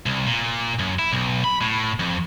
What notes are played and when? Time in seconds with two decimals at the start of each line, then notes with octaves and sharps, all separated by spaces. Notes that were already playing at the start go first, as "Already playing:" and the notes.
0.06 C2
0.27 A#2
0.79 F#2
0.99 E4
1.13 B1
1.44 B5
1.61 A2
2.00 F2